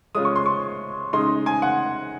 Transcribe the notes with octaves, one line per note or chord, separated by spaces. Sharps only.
C#3 G#3 C#4 F4 D#6
C#6
C6
C#6
C#3 G#3 D#4 C6
G#5
F#5